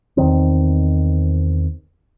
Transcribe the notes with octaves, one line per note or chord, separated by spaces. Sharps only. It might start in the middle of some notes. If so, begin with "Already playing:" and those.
E2 D#3 C4